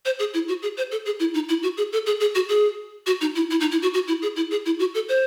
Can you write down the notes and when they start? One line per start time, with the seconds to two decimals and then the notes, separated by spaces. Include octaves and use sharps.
0.05 C5
0.19 G#4
0.34 E4
0.48 F#4
0.62 G#4
0.77 C5
0.92 A4
1.06 G#4
1.20 E4
1.34 D#4
1.49 E4
1.63 F#4
1.77 G#4
1.93 A4
2.07 G#4
2.20 G#4
2.35 F#4
2.49 G#4
3.07 F#4
3.21 D#4
3.35 E4
3.51 E4
3.60 D#4
3.72 E4
3.82 F#4
3.94 F#4
4.07 E4
4.22 G#4
4.36 E4
4.51 G#4
4.66 E4
4.79 F#4
4.95 A4
5.09 C5